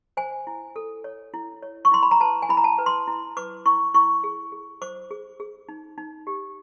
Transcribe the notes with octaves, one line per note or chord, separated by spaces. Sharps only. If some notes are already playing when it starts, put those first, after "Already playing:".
C5 G#5
E4
A4
C#5
E4
C#5
C#6
E4 C6
B5
A#5
B4 A5
G#5
E4 B5
A#5
A5
B4
C6
E4
B4 D6
E4 C#6
E4 C#6
G#4
G#4
C5 D6
G#4
G#4
D#4
D#4
G4